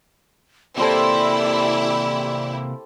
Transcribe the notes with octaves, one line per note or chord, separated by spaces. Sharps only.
C3 A#3 E4 G4 A4 C5 D5 G5